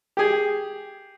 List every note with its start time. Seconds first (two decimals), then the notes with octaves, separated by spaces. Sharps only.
0.17 G4 G#4